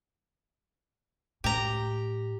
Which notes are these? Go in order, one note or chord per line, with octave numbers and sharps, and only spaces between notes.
A2 G4 A#5